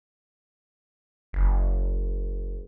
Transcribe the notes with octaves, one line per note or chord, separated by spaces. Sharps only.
F#1